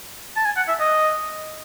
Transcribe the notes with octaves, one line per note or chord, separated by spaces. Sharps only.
A5
G#5
F#5
E5
D#5